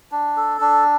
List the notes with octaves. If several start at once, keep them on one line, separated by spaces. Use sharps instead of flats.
D4
A4
D4